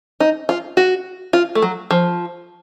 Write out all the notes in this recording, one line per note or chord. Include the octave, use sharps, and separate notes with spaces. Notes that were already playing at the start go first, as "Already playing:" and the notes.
D#4
F4
F#4
F4
A3
F#3
F3